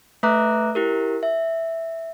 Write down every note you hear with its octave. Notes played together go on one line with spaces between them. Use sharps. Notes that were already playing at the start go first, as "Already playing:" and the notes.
A3 B4 E5 A#5 D6 F#6
E4 G4 A#4
E5